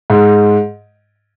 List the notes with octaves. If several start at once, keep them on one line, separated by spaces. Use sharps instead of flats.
G#2